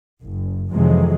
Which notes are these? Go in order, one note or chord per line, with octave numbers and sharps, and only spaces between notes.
F#1
F2 C3 D#3 E3 F#3 G#3